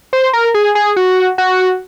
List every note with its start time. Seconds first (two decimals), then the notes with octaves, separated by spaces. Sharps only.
0.13 C5
0.33 A#4
0.54 G#4
0.75 G#4
0.96 F#4
1.38 F#4